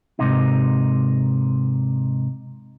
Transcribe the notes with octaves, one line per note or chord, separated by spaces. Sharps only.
G#2 C3 D#4